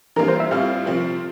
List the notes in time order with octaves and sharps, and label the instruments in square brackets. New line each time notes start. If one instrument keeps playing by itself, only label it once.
[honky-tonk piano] E3 G3 A#3 F4 [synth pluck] A#4
[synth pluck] C5
E5
[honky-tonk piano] A2 G3 C4 F4 [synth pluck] F5
[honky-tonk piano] C3 F3 C4 F4